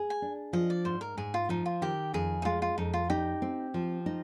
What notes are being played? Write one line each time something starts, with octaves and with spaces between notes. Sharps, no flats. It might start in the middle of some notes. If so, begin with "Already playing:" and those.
Already playing: G#4
G#5
D4
F3 D#5
D5
G#2 C5
A#4
G#2 G#4
F4
F3 D#4
F4
D#3 G4
F2 G#4
D#4
G#3 F4
F4
F2 D#4
F4
D#4 G4
C4
F3
D#4